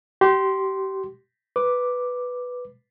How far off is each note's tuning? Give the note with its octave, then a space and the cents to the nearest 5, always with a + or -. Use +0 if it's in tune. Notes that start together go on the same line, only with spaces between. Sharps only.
G4 -30 C6 -5
B4 +0 D6 +0